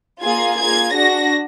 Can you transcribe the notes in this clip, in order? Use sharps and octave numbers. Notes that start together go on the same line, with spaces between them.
A#3 F4 G#4 G#6
A#3 F4 G#4 G#6
D4 F#4 A#6